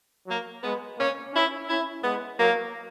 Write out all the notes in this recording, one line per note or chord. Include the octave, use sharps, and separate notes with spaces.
F#3 A#3
G#3 B3
A#3 C#4
C#4 E4
C#4 E4
G#3 B3
F#3 A#3